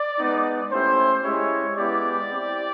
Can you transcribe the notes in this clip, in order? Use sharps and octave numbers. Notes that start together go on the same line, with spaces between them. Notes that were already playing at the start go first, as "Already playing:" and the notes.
Already playing: D5
G#3 B3 D#4
A3 C#4 E4 G4 C5
G#3 C#4 E4 G4 C#5
G#3 B3 E4 G4 D5
C4 E4 G4